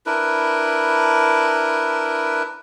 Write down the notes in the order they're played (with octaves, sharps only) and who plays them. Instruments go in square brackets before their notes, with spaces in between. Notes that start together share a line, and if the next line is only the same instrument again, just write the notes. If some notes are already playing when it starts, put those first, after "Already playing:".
[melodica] D4 E4 A#4 B4